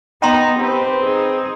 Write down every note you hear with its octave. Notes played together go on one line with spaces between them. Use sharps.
B3 D#4 G5 A#5 C6
C4 G4 B4
D#4 G#4